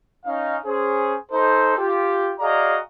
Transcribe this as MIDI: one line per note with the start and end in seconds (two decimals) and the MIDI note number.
0.26 0.57 61
0.26 0.57 63
0.26 0.57 77
0.66 1.16 61
0.66 1.16 68
0.66 1.16 72
1.32 1.77 63
1.32 1.77 69
1.32 1.77 72
1.78 2.32 65
1.78 2.32 67
2.39 2.78 66
2.39 2.78 68
2.39 2.78 74
2.39 2.78 75
2.39 2.78 77
2.39 2.78 82